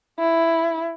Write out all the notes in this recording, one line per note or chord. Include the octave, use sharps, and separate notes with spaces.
E4